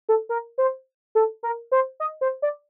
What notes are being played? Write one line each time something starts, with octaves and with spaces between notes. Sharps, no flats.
A4
A#4
C5
A4
A#4
C5
D#5
C5
D5